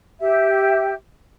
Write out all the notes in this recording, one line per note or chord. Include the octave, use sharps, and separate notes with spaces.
G4 E5